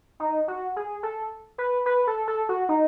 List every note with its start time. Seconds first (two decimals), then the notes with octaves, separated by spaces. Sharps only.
0.20 D#4
0.48 F#4
0.76 G#4
1.03 A4
1.58 B4
1.86 B4
2.07 A4
2.28 A4
2.49 F#4
2.69 D#4